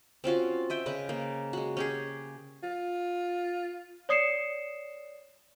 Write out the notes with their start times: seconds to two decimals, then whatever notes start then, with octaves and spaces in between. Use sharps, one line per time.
0.24 C4 C#4 F4 F#4
0.70 D#5 E5 G5
0.86 C#3 B4 D#5
1.09 A#3
1.53 G#3 F#4
1.77 C#4 G4 G#4
2.63 F4
4.09 C#5 D5 D#6 C7 C#7 E7